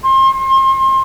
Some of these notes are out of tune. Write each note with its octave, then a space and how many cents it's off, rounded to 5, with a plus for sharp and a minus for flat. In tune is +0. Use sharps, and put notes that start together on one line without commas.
C6 +35